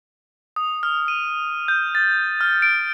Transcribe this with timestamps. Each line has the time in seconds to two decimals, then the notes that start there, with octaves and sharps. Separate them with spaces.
0.56 D#6
0.83 F6
1.08 D#7
1.68 G6
1.95 A6
2.41 F6
2.62 D7